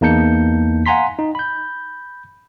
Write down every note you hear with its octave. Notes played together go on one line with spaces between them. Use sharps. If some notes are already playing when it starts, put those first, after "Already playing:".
E2 A#3 D#4 A5 G6 C#7
F5 F#5 G#5 A#5 C6 B6
D#4
B5 G6